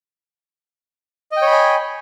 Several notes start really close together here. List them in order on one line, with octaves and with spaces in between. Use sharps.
D#5 G5 C#5 B5 G#5